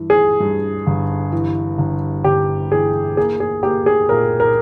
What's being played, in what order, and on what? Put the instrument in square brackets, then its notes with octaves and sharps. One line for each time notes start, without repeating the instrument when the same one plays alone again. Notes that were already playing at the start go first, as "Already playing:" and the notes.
Already playing: [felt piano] G2 E3
[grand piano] G#4
[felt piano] G2
G1
E3
G1
[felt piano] G1 [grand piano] G4
[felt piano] E3 [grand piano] G#4
[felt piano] A#3 [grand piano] G#4
[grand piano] G#4
[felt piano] A#3 [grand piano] G4
[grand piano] G#4
[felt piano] A#2 [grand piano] A#4
[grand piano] A#4